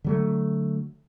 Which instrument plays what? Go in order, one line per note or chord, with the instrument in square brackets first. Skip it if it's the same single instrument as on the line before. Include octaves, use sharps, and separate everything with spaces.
[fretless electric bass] D3 F#3 A3